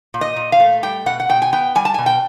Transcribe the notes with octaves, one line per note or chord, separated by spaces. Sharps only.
A#2
D#5
A#2
F5
A3
G3 G5
B2 F#5
F#5
B2 G5
G#5
B3 G5
G3 G#5
A5
B2 G#5
G5